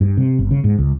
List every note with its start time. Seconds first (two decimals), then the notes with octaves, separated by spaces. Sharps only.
0.01 G2
0.17 C3
0.39 G1
0.51 C#3
0.64 G#2
0.79 C#2